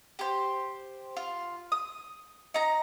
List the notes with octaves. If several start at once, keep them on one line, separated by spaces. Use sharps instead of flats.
G4 C5
F4
D#6
D#4 A#5